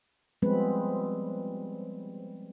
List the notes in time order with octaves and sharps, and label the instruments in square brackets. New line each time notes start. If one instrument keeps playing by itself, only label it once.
[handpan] F3 G3 G#3 B3 C4 B4